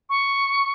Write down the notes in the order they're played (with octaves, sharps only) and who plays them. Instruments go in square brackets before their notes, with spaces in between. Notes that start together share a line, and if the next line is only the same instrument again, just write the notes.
[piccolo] C#6